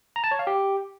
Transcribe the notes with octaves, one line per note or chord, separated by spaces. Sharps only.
A#5
A5
C#5
F5
G4